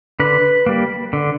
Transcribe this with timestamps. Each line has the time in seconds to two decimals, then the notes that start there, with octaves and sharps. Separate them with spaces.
0.20 D3 B4
0.66 G3 A#3
1.13 D3